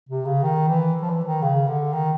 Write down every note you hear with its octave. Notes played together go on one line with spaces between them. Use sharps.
C3
C#3
D#3
E3
F3
E3
D#3
C#3
D3
D#3